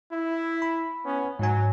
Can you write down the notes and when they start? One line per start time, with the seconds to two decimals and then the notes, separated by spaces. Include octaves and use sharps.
0.11 E4
0.62 B5
1.05 B3 C#4
1.39 G#2 F#3 G#5